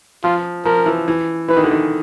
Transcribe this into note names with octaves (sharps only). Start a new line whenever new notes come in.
F3 F4
F3 A#4
E3
E3
E3 B4
D#3
D3
D#3